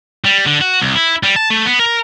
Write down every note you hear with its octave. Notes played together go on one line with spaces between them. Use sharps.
G3
D3
F#4
C2
E4
G3
A5
A3
B3
A#4